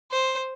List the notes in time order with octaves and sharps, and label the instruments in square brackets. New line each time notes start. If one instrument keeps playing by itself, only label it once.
[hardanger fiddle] C5